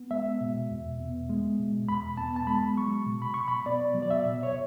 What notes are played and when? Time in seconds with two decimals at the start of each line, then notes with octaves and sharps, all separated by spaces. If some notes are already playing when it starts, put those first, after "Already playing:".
Already playing: B3
0.11 G#3 E5
0.41 B2
0.71 E2
1.00 B3
1.30 G#3
1.59 B2
1.88 E2 B5
2.17 B3 A5
2.36 A5
2.47 G#3 B5
2.77 F#3 C#6
3.06 B2
3.22 B5
3.34 B2 C#6
3.48 B5
3.66 B3 D5
3.94 F#3
4.02 D5
4.10 E5
4.25 B2
4.43 C#5